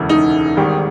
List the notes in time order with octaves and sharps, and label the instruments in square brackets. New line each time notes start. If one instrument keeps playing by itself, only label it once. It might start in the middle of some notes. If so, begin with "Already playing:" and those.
Already playing: [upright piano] E1 D2 C#3 E3 G#3
[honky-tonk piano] D#4
[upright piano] G#1 G#2 D#3 G3